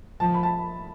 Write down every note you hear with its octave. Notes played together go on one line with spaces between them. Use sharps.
F3 A5
B5
A5